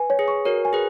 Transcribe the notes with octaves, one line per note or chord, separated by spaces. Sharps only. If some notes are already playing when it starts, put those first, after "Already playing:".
Already playing: B4 G#5
C#5
G#4
C#6
F#4 A#4 C#5
G#5
G#4 B4